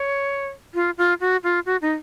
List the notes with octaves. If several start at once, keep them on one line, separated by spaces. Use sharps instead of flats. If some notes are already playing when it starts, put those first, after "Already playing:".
Already playing: C#5
F4
F4
F#4
F4
F#4
D#4